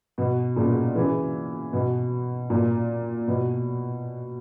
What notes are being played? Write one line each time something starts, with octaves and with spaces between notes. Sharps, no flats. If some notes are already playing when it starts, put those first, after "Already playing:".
B2
A#2 C#3
C#3 E3
B2
A#2
B2